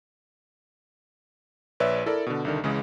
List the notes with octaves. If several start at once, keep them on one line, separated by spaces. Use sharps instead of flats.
A#1 B4 C#5 D5 E5 E6
E4 A4 A#4 D5
B2 D3
C2 D3 D#3
C#2 C#3 E3 G#3